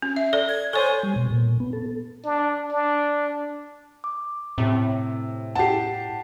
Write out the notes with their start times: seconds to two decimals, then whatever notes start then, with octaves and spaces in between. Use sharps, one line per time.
0.02 C#4
0.16 E5
0.33 A4 D5
0.50 G#6
0.73 A4 C5 C#5 G#5 C#6
1.03 G3
1.16 B2
1.30 A#2
1.60 B3
1.73 A4
2.25 D4
2.72 D4
4.04 D6
4.58 A2 C3
5.55 G4 F#5 G5 A5 C7